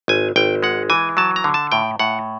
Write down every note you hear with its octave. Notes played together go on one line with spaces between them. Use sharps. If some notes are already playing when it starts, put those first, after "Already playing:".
G#1 G#5
G#1 G5
G#3 F#5
E3 G#5
F#3 A5
A#5
D3
A5
A2 G5
A2 F#5